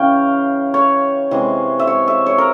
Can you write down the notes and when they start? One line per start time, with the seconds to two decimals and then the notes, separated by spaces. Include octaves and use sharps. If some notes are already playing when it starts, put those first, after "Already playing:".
Already playing: C#3 E3 C#5 F5 G5
0.74 C#5
1.31 C3 E3 G#3
1.79 E5
1.87 C#5
2.08 E5
2.26 C#5
2.38 A#4